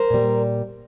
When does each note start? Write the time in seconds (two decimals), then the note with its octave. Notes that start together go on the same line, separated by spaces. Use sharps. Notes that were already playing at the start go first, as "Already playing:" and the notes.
Already playing: A#4 C5
0.10 A#2 G3